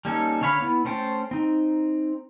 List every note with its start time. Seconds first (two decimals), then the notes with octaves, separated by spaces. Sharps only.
0.05 G3 A#3 C#4 D#4 A4
0.41 D3 C#4 C#5 F5 B5
0.61 B3 E4
0.85 A3 C#4 C5 G5 A5
1.31 C4 D#4